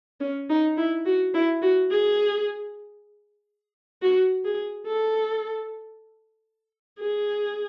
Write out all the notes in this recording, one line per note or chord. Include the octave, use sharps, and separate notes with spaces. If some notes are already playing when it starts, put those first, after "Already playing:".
C#4
D#4
E4
F#4
E4
F#4
G#4
F#4
G#4
A4
G#4